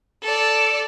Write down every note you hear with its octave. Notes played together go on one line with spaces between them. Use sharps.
A4 D5